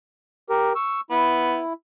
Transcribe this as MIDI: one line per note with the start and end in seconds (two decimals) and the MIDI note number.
0.50 0.73 67
0.50 0.73 70
0.76 1.01 85
0.76 1.01 88
1.11 1.59 59
1.11 1.73 64